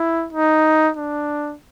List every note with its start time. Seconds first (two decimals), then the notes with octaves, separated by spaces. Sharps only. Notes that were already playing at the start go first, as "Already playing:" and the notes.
Already playing: E4
0.33 D#4
0.97 D4